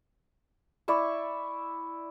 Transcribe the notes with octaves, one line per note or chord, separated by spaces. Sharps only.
E4 D5 E5 C#6